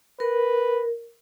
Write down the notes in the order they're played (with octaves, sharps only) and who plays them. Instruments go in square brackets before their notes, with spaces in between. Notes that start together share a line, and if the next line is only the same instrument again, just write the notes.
[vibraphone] A#4 [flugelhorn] B4